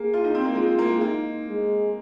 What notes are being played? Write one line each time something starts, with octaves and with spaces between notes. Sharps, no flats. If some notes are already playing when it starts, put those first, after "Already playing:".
Already playing: A#3 G#4
F4
D#4
C4
A#3
G#3 F4
A#3
G#3
A#3 D#4
G#3